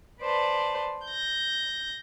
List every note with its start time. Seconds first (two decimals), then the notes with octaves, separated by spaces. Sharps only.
0.21 B4 C5 D5 A5
1.06 G6 A#6